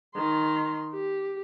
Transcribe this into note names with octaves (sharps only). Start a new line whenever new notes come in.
D#3 C6
G4